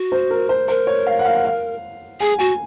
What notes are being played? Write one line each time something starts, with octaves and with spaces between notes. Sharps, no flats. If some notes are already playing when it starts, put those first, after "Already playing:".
Already playing: F#4
C5
A#4
C5
A#4 C5
C#5
F5
F#5
F5
F#5
F5
G#4 G#5
F#4 G#5